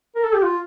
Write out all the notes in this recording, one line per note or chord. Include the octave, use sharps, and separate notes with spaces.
A#4
A4
G4
F4